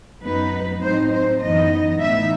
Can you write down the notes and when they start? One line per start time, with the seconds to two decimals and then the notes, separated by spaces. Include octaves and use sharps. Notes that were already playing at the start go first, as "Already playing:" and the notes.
0.23 F#2 F#3 B3 D#4 B4
0.82 A2 F#3 C4 D#4 C5
1.12 C5
1.41 F#2 E3 B3 D#4 D#5
2.00 A2 E3 B3 D#4 E5